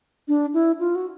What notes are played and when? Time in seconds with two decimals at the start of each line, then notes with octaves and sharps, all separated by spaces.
0.28 D4
0.54 E4
0.80 F4
0.95 F#4